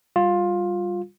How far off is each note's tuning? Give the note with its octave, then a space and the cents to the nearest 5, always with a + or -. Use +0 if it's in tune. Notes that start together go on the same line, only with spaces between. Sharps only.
G3 +0 F4 +15